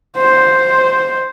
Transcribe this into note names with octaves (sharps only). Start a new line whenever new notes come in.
C5